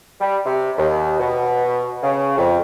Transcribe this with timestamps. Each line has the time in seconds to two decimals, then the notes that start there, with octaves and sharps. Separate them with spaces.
0.21 G3
0.46 C3
0.78 D#2
1.20 B2
2.03 C#3
2.38 F2